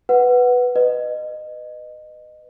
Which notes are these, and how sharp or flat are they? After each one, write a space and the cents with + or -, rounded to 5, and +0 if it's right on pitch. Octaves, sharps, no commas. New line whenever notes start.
B4 +0 F#5 +0
B4 +10 D#5 -20